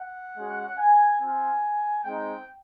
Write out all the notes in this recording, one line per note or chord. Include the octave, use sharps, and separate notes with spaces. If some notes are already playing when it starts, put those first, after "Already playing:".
Already playing: F#5
G#3 C#4 F#4
G#5
C4 F4 G#5
G#3 C4 D#4 G5